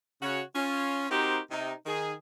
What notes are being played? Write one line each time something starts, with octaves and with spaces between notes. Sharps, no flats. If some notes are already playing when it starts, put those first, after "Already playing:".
C#3 F#4 C#5
C#4 F4
C4 D#4 F#4 G4 A#4 C5
C3 D#4
D#3 G#4